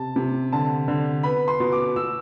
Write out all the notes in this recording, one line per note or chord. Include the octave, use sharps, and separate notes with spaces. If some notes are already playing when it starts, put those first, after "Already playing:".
Already playing: C3 A5
C3
D3 A5
D3
B3 B5
C6
B2
D6
B2 E6